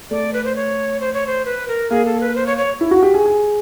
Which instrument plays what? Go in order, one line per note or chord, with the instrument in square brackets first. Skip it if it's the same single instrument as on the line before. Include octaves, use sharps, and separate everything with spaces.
[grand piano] A3 [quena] D5
[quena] B4
C5
C#5
C5
C#5
C5
B4
A#4
[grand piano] A#3 [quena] G#4
[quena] A4
B4
C5
C#5
C#5
[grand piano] E4
F#4
G4
G#4
G#4